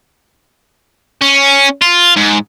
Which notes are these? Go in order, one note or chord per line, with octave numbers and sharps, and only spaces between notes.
C#4
F4
G#2